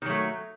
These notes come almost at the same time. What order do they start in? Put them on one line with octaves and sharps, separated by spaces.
D#3 F#3 A3